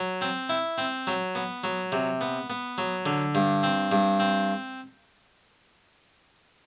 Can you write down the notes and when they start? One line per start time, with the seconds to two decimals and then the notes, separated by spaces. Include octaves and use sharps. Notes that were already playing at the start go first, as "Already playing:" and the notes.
Already playing: F#3
0.21 C4
0.49 E4
0.78 C4
1.07 F#3
1.35 B3
1.64 F#3
1.92 C3
2.21 B3
2.50 B3
2.78 F#3
3.06 D3
3.35 G2
3.63 C4
3.92 G2
4.20 C4